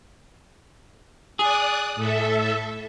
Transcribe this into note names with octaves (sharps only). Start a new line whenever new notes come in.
G#4 D5 D#6 F#6
A2 A4 E5